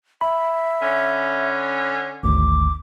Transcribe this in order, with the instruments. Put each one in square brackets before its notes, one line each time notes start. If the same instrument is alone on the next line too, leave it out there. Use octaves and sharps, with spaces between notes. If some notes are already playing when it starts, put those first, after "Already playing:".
[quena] E5 [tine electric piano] B5
[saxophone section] D3 C#4
[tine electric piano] G#1 D2 [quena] D6